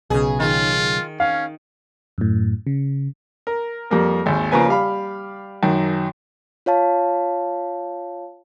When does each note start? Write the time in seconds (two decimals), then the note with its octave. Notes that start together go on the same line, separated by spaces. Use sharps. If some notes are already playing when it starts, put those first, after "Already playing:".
0.10 B1 C#3 G#4
0.40 D#3 F4
1.20 C#4 F5
2.18 F#2 A2
2.67 C#3
3.47 A#4
3.90 F2 G3 A#3 A#4
4.26 G#1 D#2
4.52 C#3 F3 A#3 B4 G#5
4.68 G3 F5 B5
5.63 F#2 D#3
6.66 F4 C#5 F5 A5